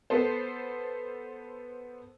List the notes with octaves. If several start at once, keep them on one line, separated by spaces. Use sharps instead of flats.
B3 A4 C5